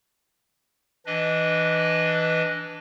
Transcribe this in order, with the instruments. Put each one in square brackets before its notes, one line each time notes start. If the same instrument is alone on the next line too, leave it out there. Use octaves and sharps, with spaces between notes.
[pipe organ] E3 D4 B4 D#5